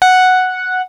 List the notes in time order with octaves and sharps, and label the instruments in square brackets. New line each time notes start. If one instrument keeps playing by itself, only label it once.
[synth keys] F#5